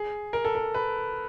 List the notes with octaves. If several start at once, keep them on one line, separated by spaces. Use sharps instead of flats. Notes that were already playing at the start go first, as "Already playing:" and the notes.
Already playing: G#4
A#4
A4
A#4
B4